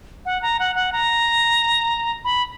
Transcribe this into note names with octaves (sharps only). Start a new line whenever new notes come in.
F#5
A#5
F#5
F#5
A#5
B5